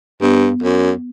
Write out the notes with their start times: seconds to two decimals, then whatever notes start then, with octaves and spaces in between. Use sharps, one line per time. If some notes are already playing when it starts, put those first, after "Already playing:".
0.22 G2 B3
0.63 F#2